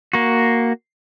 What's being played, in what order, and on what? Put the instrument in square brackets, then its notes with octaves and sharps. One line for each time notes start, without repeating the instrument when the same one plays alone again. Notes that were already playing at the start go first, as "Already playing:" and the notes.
[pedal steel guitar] A#3 F#4